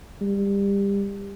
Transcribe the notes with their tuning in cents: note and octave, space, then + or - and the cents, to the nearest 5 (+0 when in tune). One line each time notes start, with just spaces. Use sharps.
G3 +25